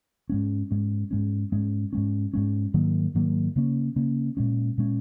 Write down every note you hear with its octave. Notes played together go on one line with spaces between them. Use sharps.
G#2 G#3 C#4
G#2 G#3 C#4
G#2 G#3 C#4
G#2 G#3 C#4
G#2 G#3 C#4
G#2 G#3 C#4
G#2 D#3 F#3 A#3
G#2 D#3 F#3 A#3
C#3 A#3 C#4
C#3 A#3 C#4
A#2 G#3 C#4
A#2 G#3 C#4